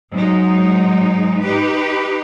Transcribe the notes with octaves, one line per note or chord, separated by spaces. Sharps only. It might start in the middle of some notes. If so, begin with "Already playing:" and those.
G#2 F#3 G#3 D#4
D#4 G4 B4